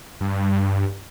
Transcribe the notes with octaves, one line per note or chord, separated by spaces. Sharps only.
G2